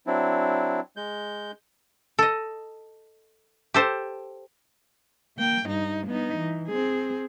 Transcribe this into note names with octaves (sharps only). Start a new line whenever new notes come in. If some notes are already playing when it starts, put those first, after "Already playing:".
F#3 C4 D4 E4
G#3 G6
A4 D#5
G4 A4 C5
A#3 G5
G2 D#4
B3 D#4
E3
C4 G#4